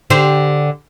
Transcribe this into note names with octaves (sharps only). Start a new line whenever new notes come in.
D3 G4 C5